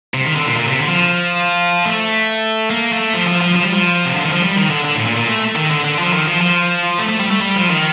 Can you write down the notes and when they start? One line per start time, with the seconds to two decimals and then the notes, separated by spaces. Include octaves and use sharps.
0.14 C3
0.25 D#3
0.36 D3
0.46 A#2
0.57 A#2
0.67 C3
0.78 D3
0.88 F3
1.85 A3
2.70 A#3
2.93 A3
3.14 F3
3.27 F3
3.42 F3
3.56 F3
3.64 G3
3.72 F3
4.05 C3
4.14 D3
4.24 D#3
4.33 F3
4.42 G3
4.56 D#3
4.70 D3
4.84 D3
4.95 A2
5.06 A#2
5.16 A#2
5.28 A3
5.55 D#3
5.71 D3
5.85 D3
5.99 F3
6.13 D#3
6.27 F3
6.41 F3
6.99 A3
7.09 A3
7.20 G3
7.31 A3
7.41 G3
7.56 F3
7.70 D#3